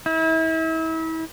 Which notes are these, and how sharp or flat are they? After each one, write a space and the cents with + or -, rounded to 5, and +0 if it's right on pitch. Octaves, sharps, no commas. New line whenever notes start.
E4 -35